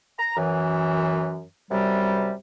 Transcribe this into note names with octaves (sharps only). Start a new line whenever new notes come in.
A#5
F#2 E3
F#2 C3 G3